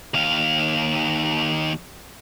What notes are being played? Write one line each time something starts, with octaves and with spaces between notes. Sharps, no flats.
D#2 F5